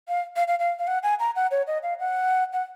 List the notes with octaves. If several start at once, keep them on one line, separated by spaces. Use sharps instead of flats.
F5
F5
F5
F5
F5
F#5
G#5
A#5
F#5
C#5
D#5
F5
F#5
F#5